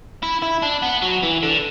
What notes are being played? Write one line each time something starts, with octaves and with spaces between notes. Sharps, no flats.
E4
E4
D4
B3
F#3
E3
D3